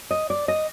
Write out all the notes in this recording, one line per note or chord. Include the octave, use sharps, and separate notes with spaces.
D#5
D5
D#5